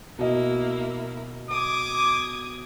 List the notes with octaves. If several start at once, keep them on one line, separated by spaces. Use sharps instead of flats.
B2 A#3 E4 D#5
D6 D#6 G#6